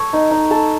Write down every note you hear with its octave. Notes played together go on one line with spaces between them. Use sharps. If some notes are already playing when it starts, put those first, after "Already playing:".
Already playing: A4 C#5
D#4
D#4
A4